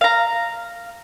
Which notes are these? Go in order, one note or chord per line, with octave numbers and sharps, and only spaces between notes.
F5 A#5